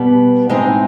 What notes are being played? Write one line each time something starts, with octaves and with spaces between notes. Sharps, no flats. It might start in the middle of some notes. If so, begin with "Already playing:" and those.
Already playing: B2 G3 B3
A2 E3 G#3 C4 D#4